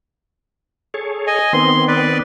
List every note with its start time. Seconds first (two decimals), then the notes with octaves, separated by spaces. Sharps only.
0.94 G#4 A4 C#5
1.27 D#5 G#5
1.53 D#3 B3 C4 C6
1.88 B4 D5